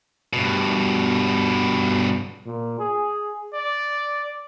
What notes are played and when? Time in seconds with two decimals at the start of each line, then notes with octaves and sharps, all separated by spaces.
0.33 G2 B2
2.46 A#2
2.79 G#4
3.55 D5